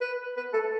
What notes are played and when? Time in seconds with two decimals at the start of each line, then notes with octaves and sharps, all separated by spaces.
0.01 B4
0.37 B4
0.53 A4